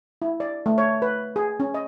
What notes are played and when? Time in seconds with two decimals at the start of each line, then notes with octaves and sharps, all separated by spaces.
0.22 E4
0.40 D5
0.66 A3
0.78 C#5
1.02 B4
1.36 G#4
1.60 C#4
1.74 D#5